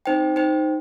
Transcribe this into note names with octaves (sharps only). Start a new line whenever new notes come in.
C4 D#4 C5 G5
D#4 C5 G5